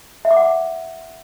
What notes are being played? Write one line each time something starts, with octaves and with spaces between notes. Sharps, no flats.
E5
D6
F#5
D6